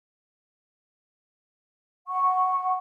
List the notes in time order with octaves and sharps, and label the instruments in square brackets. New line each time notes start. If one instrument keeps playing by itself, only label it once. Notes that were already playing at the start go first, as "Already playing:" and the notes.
[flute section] F#5 C#6